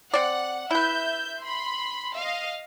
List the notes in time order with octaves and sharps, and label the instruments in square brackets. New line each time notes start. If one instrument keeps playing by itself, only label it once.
[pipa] C4 D5 [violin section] F#5
[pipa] E4 B4 [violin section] E5 G6
[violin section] B5 C6
D#5 F5